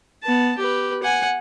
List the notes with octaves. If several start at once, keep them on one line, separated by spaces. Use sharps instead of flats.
B3 A5
G4 B4
F#5 G#5